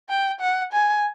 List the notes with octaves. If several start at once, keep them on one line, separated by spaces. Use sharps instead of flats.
G5
F#5
G#5